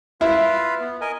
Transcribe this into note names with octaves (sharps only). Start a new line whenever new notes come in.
E4 F4 B4 F5
B3
A#4 D#5 G#5